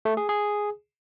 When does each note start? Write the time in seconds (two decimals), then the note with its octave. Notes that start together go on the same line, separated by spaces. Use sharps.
0.05 A3
0.17 G#4
0.29 G#4